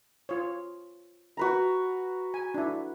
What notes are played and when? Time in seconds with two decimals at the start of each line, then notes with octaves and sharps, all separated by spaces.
0.29 F4 C#5
1.37 F#4 B4 A#5
2.34 G#5
2.54 D4 E4